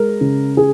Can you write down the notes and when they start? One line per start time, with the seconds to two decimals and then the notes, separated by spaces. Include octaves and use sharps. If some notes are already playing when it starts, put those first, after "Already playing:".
Already playing: G#3 A#4
0.21 C#3
0.57 G#4